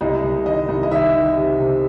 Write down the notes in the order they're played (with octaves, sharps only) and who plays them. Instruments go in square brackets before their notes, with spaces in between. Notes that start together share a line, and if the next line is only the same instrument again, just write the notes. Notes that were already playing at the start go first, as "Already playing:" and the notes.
[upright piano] C2 D#5
C2
D#3 D#5
C2
D#5
D#3 E5
D#3
C3
C3